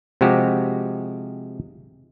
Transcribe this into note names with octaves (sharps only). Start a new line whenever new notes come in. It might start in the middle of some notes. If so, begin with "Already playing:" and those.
C3 F3 G#3 F#4 G4